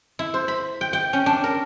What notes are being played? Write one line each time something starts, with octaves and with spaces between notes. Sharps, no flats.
E4
C5
B5
G5
G5
C#4
D4
A#4